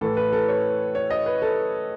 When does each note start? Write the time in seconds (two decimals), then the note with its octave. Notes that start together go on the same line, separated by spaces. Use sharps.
0.01 A2 E3 A4
0.17 B4
0.33 A4
0.49 C#5
0.95 C#5
1.10 D#5
1.26 B4
1.42 A4